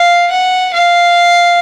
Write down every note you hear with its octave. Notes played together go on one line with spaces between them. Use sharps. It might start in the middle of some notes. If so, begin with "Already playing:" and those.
Already playing: F5
F#5
F5